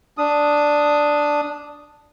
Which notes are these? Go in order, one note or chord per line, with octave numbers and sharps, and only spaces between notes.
D4 D#6